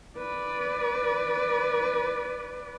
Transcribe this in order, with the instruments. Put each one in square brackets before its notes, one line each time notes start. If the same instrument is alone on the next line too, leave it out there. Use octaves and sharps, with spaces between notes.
[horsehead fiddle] B4 D5